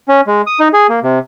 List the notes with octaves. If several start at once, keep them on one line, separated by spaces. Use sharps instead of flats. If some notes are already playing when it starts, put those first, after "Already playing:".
C#4
G#3
D#6
D#4
G#4
A#3
C3